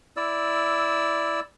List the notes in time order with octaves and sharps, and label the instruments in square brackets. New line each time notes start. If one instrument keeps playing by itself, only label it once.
[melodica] E4 D5 E6